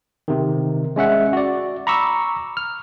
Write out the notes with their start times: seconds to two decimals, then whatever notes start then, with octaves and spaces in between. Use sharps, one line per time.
0.28 C3 D#3
0.96 G#3 C#4 E5 F#5
1.33 F#4 D5
1.87 A#5 B5 C#6 D6 E6
2.57 F6